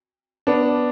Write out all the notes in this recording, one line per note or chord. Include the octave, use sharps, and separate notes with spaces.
B3 D4